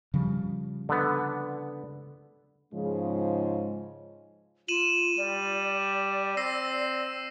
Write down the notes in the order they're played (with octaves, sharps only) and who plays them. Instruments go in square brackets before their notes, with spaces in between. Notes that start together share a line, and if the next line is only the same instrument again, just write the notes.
[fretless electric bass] C#3 F3 G3
[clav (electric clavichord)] D3 B3
[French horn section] G#2 C#3 F3 G#3
[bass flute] F4 [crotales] D#7 E7 F#7
[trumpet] G3 [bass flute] D5
[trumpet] C4 [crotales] E6 A#6 C7